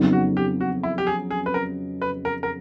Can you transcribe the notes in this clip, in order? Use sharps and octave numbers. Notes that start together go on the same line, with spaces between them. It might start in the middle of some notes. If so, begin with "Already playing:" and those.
Already playing: F2 C#3 F#3 B3 D#4
F#4
G4
F#4
E4
G4
G#4
G#4
B4
A#4
B4
A#4
A#4